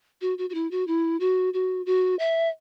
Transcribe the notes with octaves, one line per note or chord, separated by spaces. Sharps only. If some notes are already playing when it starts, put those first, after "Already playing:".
F#4
F#4
F#4
E4
F#4
E4
F#4
F#4
F#4
E5